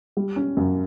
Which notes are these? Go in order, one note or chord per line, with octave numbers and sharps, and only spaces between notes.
G3
C#4
F#2